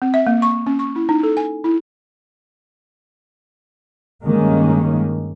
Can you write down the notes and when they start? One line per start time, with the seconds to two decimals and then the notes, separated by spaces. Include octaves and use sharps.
0.02 C4
0.14 E5
0.27 A#3
0.42 C#6
0.66 C#4
0.79 C#6
0.96 E4
1.09 D#4
1.23 A4
1.37 G#5
1.64 E4
4.25 G2 D#3 G#3 A#3 C#4